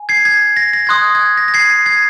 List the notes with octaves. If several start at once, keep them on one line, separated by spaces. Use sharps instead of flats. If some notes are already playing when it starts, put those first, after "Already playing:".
Already playing: G#5
G#6 C7
G#6
A#6
A#6
C6 D#6 F#6 G#6
G#6
A#6
A#6
G#6 C7
G#6
G#6 C7